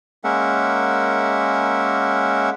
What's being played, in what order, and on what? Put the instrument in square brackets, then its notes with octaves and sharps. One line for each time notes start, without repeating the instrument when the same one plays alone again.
[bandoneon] G#3 A#3 C#4 A#4 E5 F#5